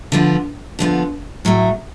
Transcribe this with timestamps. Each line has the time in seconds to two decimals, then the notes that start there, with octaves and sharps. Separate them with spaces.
0.12 D3 F3 B3 F4
0.79 D3 F3 B3 F4
1.45 A2 F#3 A3